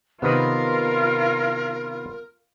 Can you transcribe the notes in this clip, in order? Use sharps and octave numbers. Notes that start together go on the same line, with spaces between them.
C3 D#3 B3 F4 A#4 B4